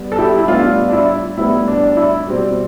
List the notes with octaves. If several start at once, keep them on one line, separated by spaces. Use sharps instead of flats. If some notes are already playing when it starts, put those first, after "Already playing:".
Already playing: G3 B3
A4
E4 G4
E4
A2 G3 B3 D4 F4
D4
E4
A2 G3 B3 E4
D4
D4
E4
B2 G3 C4